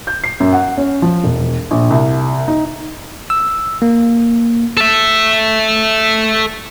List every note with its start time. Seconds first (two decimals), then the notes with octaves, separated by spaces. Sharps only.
0.07 G6
0.24 C7
0.40 F#2
0.53 F#5
0.77 C#4
1.02 F3
1.24 E1
1.71 A#1
1.90 C2
2.48 D#4
3.30 E6
3.82 A#3
4.77 A4 E5